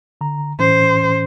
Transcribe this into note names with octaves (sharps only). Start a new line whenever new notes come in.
D3 A#5
A2 E3 C#4 C5